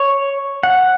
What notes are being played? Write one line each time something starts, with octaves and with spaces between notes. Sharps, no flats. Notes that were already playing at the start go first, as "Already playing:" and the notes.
Already playing: C#5
F#5